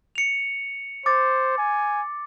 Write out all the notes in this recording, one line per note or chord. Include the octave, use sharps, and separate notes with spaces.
C#7 F7
C5 D6 A6
G#5